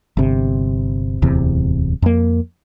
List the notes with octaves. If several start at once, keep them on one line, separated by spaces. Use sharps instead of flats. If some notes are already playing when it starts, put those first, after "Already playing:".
G1 C3
D1 E2 C3
F2 A#3